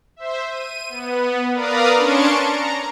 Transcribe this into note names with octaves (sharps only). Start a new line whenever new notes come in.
C5 E5
D#7
B3
A#4 B4 D5 F5 A#5 D#6
C#4 D4 A5 C6 C#6 D7
A#5